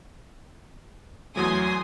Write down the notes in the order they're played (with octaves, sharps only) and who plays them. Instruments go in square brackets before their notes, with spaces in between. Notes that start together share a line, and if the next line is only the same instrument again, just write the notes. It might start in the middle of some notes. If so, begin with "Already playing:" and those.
[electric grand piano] E2 F#3 A3 [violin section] G#5 C6 D#6